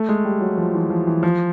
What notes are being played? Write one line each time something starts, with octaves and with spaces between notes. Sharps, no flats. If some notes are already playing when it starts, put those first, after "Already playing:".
Already playing: A3
G#3
G3
F#3
F3
E3
F3
E3
F3